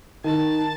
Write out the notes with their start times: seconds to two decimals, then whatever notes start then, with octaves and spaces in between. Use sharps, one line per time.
0.24 D#3 A5